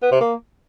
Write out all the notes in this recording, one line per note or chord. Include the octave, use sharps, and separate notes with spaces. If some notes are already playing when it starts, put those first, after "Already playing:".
B3
C3
A#3